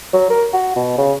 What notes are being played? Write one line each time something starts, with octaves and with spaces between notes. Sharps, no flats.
F#3
A#4
F#4
B2
C#3